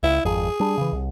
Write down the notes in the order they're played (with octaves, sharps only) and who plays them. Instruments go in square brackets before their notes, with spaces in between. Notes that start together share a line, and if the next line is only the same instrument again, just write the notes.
[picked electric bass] C#2 [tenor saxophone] E4
[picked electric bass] G#1 F2 [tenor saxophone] G#4
[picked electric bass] G3 D4
C#3 E3
C2